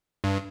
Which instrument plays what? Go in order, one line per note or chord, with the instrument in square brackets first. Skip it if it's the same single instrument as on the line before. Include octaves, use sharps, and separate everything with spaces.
[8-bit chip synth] G2